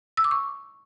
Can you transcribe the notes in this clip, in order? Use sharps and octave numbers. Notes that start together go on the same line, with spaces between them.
E6
D6
C#6